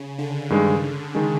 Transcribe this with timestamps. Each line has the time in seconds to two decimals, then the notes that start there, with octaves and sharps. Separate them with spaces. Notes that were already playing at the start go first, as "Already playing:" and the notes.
Already playing: C#3
0.19 D3
0.50 G2 D#3 G#3
1.15 D#3 G#3